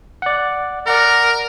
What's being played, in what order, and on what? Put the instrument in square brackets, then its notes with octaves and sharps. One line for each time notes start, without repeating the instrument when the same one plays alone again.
[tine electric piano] D5 F#5
[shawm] A#4 [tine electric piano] D5 F#5 A#5